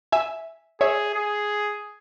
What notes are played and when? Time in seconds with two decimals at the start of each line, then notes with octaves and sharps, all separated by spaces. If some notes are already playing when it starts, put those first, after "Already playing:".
0.12 E5 G#5
0.81 G#4 C#5 E5
1.15 G#4